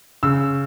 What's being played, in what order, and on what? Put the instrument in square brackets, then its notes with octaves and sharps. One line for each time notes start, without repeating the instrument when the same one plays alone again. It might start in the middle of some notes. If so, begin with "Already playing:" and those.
[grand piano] C#3 E6